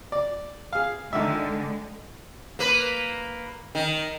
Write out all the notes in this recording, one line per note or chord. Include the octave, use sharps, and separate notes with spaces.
D5
G#4 F5
D3 D#3 G#3 E5
A#3 B4
D#3